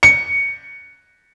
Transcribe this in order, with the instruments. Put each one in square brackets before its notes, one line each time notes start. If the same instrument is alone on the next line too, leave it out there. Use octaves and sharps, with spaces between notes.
[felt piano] C#7